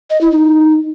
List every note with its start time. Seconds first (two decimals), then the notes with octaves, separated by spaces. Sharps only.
0.10 D#5
0.21 E4
0.32 D#4